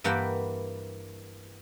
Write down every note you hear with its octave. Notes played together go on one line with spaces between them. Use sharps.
G2 E3 A#3 B4 F#5 G5